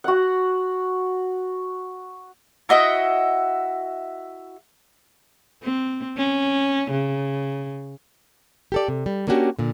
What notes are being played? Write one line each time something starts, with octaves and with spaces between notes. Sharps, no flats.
F#4 F#5
E4 F#4 D#5 E5
C4
C#4
C#3
G4 A4 D5
C3
G3
A#3 C#4 D4 F#4 G4
A#2 D3